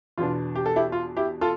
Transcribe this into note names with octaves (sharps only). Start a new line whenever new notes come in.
E2 B2 B3 D4 F4
G4
A4
E4 G4
F4
E4 G4
F4 A4